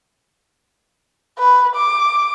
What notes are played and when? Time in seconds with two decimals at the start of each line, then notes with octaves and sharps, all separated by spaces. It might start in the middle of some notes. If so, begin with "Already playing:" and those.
1.39 B4
1.76 D6